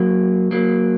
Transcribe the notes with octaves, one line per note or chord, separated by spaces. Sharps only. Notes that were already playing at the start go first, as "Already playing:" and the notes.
Already playing: F#3 A#3
F#3 A#3